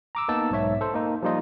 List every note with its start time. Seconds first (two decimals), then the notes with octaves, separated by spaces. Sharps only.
0.15 A#5 D6 E6
0.28 A#3 B3 D#4 A5 E6
0.51 B1 G#2 C#5 E5
0.81 A4 C5
0.94 A#3 D#4
1.22 F3 G3 A#3 D#4 F4 D#5